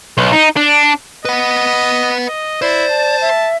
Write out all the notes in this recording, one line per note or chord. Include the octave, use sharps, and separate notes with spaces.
B1
D#4
D4
B4 D#5 F#5
D#5
E4 C5 D5
A5
E5